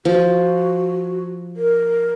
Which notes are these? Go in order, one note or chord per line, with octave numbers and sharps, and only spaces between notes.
F3 F#4
A#4